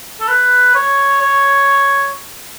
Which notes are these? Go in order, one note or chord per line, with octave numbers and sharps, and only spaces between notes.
A4
B4
C#5
C#5